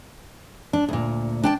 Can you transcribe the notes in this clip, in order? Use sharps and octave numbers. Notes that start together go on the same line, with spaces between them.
D4
D2 A#2
D4 G5 A5